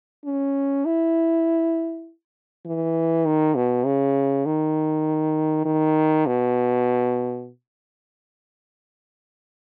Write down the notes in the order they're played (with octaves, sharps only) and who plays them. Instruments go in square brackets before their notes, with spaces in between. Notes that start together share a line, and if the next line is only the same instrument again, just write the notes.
[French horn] C#4
E4
E3
D#3
B2
C#3
D#3
D#3
B2